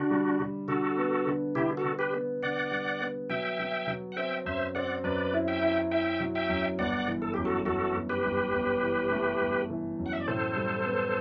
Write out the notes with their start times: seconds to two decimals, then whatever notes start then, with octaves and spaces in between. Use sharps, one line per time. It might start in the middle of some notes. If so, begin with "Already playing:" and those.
Already playing: D3 D4 F#4
0.10 G3
0.40 G3
0.68 D3 F#4 A4
0.97 B3
1.26 D3
1.55 D3 E4 G4
1.77 F#4 A4
1.84 D3
1.99 G4 B4
2.13 B3
2.43 D3 D5 F#5
2.71 G3
3.01 B3
3.30 F#3 E5 G5
3.59 F#3
3.87 F#3
4.12 F#5
4.16 C4 E5 G5
4.45 F#2 C5 E5
4.75 C4 D5 F#5
5.04 F#2 B4 D5
5.33 E4
5.48 E5 G5
5.62 E4
5.91 E4 E5 G5
6.20 F#3
6.35 E5 G5
6.49 F#2
6.79 G1 D5 F#5
7.08 E3
7.22 A4
7.34 F#2 G4
7.45 F#4 A4
7.65 F#2 F#4 A4
7.95 G1
8.09 G4 B4
8.24 G1
8.53 G1
8.82 E3
9.11 A3
9.40 G1
9.70 E3
9.99 F#2
10.06 F#5
10.13 E5
10.20 D5
10.28 A2 A4 C5
10.56 G3
10.85 B3